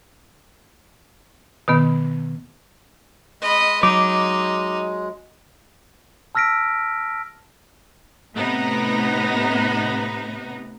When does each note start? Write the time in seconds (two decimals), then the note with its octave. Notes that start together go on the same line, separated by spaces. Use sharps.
1.68 B2 D#3 B3
3.42 G#3 D#5 B5
3.83 F#3 D#4 D6
6.35 A5 E6 F6 A#6 B6 D7
8.34 A2 C3 B3 D#4